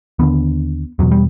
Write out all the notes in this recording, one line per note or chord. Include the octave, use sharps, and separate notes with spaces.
D#2 D3 B3
E2 B2 F#3
G3